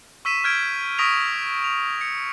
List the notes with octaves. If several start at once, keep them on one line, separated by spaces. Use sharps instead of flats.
C#6 E6 B6 D#7 E7
F6 G6 G#6 D7
C#6 D#6 A#6 B6 D7 F7
F7
C#7